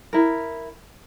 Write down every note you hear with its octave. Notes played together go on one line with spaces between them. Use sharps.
E4 A#4